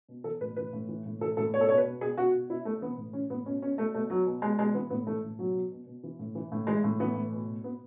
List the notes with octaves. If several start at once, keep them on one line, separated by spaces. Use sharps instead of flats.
B2
E3 A4
A2 B4
E3 B4
A2
E3
A2
E3 A4
A2 A4
B2 C#5
A4
B2 C#5
B4
B2
B2 G#4
B2 F#4
B2
B2 E4
B2 A3
E3 B3
A2
E3 C#4
A2 B3
B2 C#4
B2 C#4
B2 A3
B2 A3
B2 F#3
B2
B2 G#3
B2 G#3
E3 B3
A2 B3
E3 A3
A2
B2 F#3
B2
B2
B2
E3
A2
E3
A2
E3 G#3
A2
E3 B3
A2
B2
B2
B2 B3